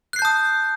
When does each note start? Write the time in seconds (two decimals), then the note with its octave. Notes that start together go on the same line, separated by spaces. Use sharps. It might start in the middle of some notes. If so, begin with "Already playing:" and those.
0.13 F#6
0.16 C7
0.19 G6
0.22 A5
0.25 D#6